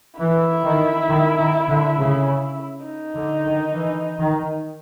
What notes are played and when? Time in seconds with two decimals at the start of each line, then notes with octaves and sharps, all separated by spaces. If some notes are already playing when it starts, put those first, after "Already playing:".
0.19 E3 E4
0.64 D#3
1.08 D#3
1.38 D#3
1.68 D3
1.96 C#3
2.85 D#4
3.15 D3
3.45 D#3
3.74 E3
4.18 D#3